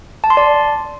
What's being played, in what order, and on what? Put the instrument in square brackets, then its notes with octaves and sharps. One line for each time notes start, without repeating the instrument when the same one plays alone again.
[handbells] A5
C6
D5